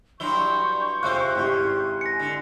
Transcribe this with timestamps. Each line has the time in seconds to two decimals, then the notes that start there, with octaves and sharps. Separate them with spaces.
0.20 G2 F#3 E4 C6 C#6 G6 G7
1.03 C3 G#3 F4 C5 F#6
1.35 G#1 C#3 E4 G4
2.01 G#5 A#6 C#7
2.19 D3